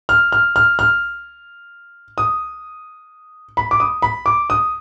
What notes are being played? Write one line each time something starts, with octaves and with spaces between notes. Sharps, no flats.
F6
F6
F6
F6
D#6
B5
D6
D#6
B5
D6
D#6